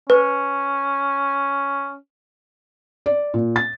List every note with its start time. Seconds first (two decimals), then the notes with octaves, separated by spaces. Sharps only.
0.10 C#4 B4
3.06 D5
3.34 A#2
3.56 A6